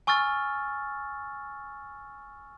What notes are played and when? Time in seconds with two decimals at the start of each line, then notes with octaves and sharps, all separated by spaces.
0.07 G#5 C#6 E6 F6 A6